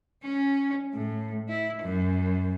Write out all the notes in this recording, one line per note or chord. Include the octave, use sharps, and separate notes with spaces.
C#4
A2
E4
F#2